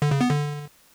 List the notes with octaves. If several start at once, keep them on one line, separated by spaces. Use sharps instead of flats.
D3
C#3
B3
D3